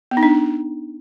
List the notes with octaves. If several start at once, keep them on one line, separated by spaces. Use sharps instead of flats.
B3
D#4
D4